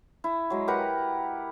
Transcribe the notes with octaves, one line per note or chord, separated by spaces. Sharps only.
E4
F#3 G#3
G4 A#4 B4 F#5